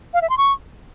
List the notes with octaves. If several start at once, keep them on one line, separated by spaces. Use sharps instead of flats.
F5
E5
C6
C#6